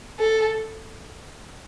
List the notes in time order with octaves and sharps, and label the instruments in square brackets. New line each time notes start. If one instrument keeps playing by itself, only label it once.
[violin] A4